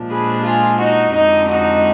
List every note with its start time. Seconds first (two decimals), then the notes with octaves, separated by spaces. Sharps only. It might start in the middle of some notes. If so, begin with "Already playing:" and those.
Already playing: A#2 F3 G#3 D4
0.09 G#4 B4
0.44 F4 G#4
0.79 D#4 F#4
1.13 F2 D3 G#3 D#4
1.49 D#4 F#4